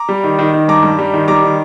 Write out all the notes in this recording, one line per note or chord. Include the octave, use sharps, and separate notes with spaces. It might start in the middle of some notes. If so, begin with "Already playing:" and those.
Already playing: A#5 D6
G3
D#3
D#3
D#3
G2 A#5 D6
G2
G3
D#3
G3 A#5 D6
D#3